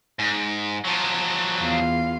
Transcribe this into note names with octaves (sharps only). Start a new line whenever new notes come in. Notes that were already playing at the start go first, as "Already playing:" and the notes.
G#2
F3 F#3
E2 F4 F5